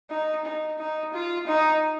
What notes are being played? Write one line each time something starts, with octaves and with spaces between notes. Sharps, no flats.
D#4
D#4
D#4
F4
D#4